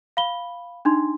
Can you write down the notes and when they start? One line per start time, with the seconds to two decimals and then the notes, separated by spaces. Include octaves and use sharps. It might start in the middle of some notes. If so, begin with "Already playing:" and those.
0.17 F5 B5 G7
0.85 D4 D#4 C6